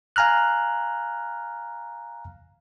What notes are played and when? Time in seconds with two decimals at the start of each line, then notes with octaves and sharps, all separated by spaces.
0.16 F5 G#5 A#5 F6 F#6